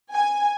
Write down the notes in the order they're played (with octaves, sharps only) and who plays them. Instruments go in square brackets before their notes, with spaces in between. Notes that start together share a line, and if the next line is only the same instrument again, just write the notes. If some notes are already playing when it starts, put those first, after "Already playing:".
[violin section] G#5